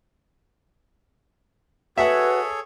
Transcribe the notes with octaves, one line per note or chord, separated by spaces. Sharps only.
F#4 G#4 A4 B4 C#5 E5 F#5